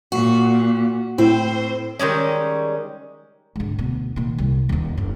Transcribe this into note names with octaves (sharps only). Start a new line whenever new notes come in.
A#2 F#4
A2 C4 C5
D#3 G3 G#3 C#4
G#2 D3
D2 B2
A#2 D#3
C2
D#1 D#2
F#1